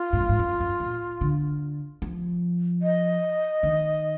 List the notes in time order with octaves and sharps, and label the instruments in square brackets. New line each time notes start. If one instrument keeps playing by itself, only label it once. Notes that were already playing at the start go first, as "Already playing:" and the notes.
Already playing: [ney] F4
[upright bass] G#2
A#2
G#2
F#2
F#2
A#2
D3
F3
[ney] D#5
[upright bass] D#3